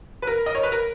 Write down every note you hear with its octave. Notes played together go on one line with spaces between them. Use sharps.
B4
A#4
D#5
C#5
B4
A#4